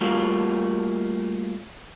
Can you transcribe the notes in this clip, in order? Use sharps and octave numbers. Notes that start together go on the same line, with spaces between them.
G3 A3 A#3 F4 F#4